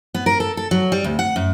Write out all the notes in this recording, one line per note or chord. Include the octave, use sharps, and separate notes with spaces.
B3
A#4
A4
A4
F#3
G3
D2
F#5
F#2